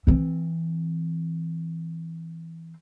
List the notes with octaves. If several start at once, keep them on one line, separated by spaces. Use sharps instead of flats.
E3 C4